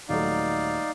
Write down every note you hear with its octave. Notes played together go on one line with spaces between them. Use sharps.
D#1 F#3 A3 D#4 D5 F5